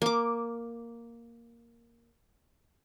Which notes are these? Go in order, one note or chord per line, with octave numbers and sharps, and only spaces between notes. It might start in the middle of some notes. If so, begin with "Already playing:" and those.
A#3 D6